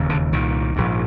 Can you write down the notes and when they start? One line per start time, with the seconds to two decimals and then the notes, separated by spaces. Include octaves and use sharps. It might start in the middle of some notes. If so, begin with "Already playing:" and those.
Already playing: E1 D#2 C#3
0.09 D3
0.32 C2 A#2 D#3
0.76 A#1 G#2